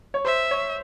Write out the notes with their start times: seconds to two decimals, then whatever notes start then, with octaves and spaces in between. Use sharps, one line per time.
0.14 C#5
0.25 C5 E5
0.51 C#5